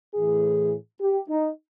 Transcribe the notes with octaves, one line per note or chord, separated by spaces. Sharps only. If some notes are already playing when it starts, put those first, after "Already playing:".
A2 E3 G#4
G4
D#4